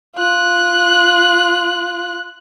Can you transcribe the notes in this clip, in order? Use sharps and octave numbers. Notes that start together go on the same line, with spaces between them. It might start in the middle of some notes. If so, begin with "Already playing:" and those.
F4 F#6